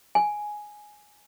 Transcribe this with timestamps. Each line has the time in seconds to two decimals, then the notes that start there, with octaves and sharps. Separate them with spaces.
0.15 G#5